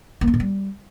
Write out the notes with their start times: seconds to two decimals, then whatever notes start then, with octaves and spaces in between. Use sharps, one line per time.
0.21 A#3
0.27 C#4
0.34 B2
0.40 G3